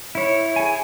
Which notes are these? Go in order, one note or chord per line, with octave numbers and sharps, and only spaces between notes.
E4 C#5
G#4 G#5